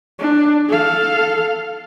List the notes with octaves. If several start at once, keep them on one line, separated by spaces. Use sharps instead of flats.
D4
A4 F5